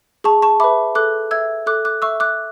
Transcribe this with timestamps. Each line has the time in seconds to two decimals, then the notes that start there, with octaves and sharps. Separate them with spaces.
0.24 G#4 A5 C#6
0.42 A5 C#6
0.60 B4 E5 B5 D6
0.95 A4 D6 F#6
1.31 E5 E6 G#6
1.66 A4 D6 F#6
1.85 D6 F#6
2.02 E5 C#6 E6
2.20 D6 F#6